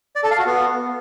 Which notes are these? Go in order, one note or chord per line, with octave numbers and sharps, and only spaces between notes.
D5
A4
F5
F#4
B3